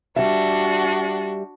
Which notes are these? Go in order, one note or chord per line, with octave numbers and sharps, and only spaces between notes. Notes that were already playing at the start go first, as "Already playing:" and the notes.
G3 D4 F#4 E5